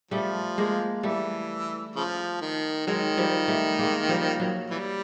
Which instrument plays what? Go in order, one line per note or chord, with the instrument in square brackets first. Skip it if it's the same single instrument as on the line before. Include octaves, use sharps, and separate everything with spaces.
[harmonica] C#3 F3 [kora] G3 A3
[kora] G#3 A#3
[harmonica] E3 [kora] G3 A3
[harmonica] C#3 F3
D#3
[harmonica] D#3 [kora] F#3 G#3
[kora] F3 G3
G3 A3
G#3 A#3
F3 G3
F#3
[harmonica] E3 G3